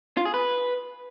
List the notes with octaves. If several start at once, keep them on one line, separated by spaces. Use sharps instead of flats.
F4
G#4
B4